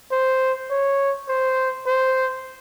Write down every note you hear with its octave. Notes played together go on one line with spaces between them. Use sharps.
C5
C#5
C5
C5